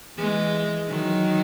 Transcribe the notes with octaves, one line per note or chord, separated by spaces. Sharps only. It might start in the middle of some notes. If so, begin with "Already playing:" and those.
E3 G#3
D#3 F#3